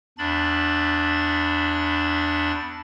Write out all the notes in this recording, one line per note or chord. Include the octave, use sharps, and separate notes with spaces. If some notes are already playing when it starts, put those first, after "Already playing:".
E2 D4 B5 A6